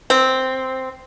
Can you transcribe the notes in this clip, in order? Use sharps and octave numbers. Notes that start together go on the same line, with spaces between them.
C4